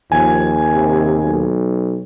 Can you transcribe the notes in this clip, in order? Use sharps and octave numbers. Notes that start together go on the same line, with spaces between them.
D#2 F3 G#5
C3
B1